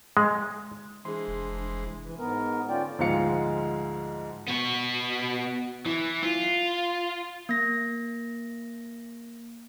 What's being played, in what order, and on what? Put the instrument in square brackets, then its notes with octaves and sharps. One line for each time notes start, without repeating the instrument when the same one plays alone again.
[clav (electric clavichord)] G#3
[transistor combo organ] E3 G#3 C5 [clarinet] D4 [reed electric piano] G#4 C6
[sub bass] F1
[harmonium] E3
G#2 B3 A#4
D3 C#4 F4 D5 G5
[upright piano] D2 G#2 F3 G#3 F5 C#7
[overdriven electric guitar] B3 F#4
E3
F4
[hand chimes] A#3 A#6